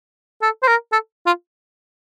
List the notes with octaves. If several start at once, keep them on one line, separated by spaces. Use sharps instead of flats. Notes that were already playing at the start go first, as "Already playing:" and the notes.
A4
C5
A#4
A4
F4